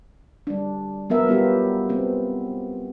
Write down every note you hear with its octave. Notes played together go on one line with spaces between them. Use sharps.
G3 D4
F#3 B3 A#4 E5
G3 B3 F4 G4
B3 C4